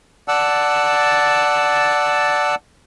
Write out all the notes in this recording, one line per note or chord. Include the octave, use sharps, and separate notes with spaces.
D5 F#5 A5 E6